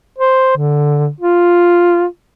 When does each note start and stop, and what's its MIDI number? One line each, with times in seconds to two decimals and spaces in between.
0.19 0.53 72
0.57 1.09 50
1.21 2.05 65